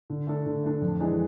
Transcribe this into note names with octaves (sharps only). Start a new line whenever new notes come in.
D3
A3 D4 A4
D3
A3 D4 A4
F2
E3 G#3 D4 G#4